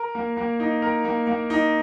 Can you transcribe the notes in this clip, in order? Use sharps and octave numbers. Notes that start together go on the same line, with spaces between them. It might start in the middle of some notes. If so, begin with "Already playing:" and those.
Already playing: A#4
A#3
A#3
D#4
A#4
A#3
A#3
D#4